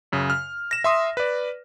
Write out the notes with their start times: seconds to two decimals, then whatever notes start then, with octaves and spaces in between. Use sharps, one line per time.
0.12 F#2 C#3
0.30 F6
0.71 A#6 E7
0.84 E5 C6 D#6
1.17 B4 D5